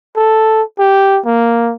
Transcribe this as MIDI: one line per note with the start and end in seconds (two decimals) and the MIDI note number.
0.17 0.62 69
0.79 1.20 67
1.26 1.74 58